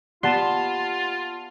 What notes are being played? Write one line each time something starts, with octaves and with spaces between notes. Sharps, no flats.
B3 F4 G4 D5 F#5 A5 C6 E7